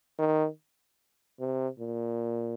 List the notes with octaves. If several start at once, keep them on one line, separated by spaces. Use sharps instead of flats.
D#3
C3
A#2